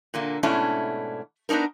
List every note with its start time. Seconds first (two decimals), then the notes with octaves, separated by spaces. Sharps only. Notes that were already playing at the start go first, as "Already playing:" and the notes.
0.14 A#2 D3 A#3
0.43 G#2 B2 A3 C#4 D4 E4
1.49 B3 C4 D4 D#4 A#4